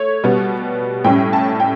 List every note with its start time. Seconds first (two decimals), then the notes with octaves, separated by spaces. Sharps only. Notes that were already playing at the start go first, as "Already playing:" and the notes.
Already playing: A3 C#5
0.24 B2 G3 B3
1.04 A2 G3 C#4 G5
1.33 A5
1.60 G5